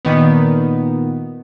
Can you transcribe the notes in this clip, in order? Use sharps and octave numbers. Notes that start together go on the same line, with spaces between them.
A#2 D#3 B3